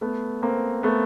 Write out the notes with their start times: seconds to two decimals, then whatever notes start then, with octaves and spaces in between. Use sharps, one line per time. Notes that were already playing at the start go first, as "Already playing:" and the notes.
0.01 A3 B3
0.42 A#3 C4
0.83 A3 B3